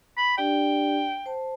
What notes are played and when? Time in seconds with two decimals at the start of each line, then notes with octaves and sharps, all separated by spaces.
0.17 B5
0.38 D4 G4 D5 G5
1.26 C5 A5